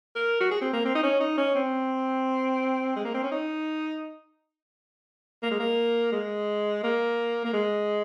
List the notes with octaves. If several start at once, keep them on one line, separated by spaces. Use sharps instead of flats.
A#4
F#4
G#4
C4
A#3
C4
D#4
C#4
D#4
C#4
C4
G#3
A#3
C4
C#4
D#4
A#3
G#3
A#3
G#3
A#3
A#3
G#3